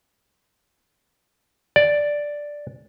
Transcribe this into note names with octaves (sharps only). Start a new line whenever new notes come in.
D5